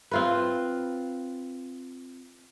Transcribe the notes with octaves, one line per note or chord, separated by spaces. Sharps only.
C4 F4 B4